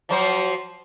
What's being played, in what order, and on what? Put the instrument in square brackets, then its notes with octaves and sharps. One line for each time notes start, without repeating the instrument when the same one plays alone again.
[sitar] F3 F#3 C5